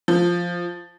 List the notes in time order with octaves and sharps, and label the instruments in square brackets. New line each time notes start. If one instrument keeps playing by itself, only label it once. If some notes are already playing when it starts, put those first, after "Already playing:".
[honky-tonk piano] F3